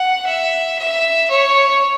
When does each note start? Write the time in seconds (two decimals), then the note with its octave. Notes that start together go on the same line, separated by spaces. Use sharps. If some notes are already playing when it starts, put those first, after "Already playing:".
Already playing: F#5
0.26 E5
0.78 E5
1.30 C#5